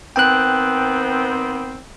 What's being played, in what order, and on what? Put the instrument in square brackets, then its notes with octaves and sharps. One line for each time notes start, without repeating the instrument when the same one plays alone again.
[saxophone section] D#3 B3 C4 [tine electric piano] G5 F#6